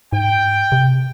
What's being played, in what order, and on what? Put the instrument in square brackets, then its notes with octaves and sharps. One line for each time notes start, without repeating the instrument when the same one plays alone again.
[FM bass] G#2 [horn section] G5
[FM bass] C3